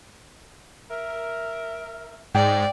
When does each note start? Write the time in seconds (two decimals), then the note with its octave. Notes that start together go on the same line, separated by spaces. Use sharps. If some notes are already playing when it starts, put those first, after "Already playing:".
0.90 A#4 E5
2.35 G#2 D5 G5